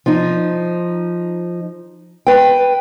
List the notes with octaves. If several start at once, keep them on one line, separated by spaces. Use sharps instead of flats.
F3 D#4
B4 G5